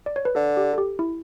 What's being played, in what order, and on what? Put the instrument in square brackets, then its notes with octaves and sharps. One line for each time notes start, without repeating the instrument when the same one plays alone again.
[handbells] D5
C#5
B4
[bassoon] D3 [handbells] A4
[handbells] G4
A4
G4
E4